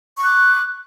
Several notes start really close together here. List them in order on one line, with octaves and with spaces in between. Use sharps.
C#6 F#6 D6